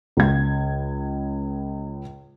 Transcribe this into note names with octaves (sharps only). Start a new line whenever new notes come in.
C#2 G#6